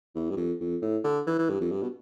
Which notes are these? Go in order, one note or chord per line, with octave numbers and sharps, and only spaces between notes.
E2
G2
F2
F2
A2
D3
E3
E3
G2
F2
G2
B2